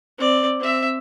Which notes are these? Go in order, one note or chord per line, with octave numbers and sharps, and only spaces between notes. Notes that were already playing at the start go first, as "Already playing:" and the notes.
C4 D5
C4 E5